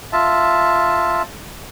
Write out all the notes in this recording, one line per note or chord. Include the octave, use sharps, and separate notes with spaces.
F4 E5 A5